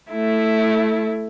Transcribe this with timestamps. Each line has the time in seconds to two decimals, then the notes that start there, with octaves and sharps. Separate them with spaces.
0.11 A3 E4